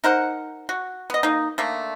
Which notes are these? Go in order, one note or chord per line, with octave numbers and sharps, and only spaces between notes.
D#4 A#4 C5 F#5
F#4
B3 D#5
A#3 D#4
D3 A3 A#3